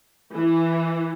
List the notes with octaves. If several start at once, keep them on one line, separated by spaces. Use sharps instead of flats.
E3